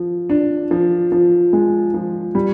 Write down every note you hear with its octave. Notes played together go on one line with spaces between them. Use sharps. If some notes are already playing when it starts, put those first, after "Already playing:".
Already playing: F3
D4
F3
F3
G#3
F3
G3